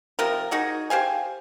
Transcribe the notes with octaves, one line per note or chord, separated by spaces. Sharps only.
C3 F3 A#4
D#4 F#4 G#4
G4 C5 F5 G#5